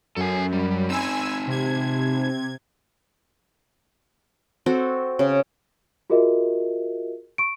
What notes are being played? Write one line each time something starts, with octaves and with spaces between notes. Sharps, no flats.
F#2 A4 G#5
G3
C4 D#4 G#5 E6
C3 G#6
C4 F#4 A4
C#3
F4 F#4 G#4 A#4 D#5 E5
C#6 D7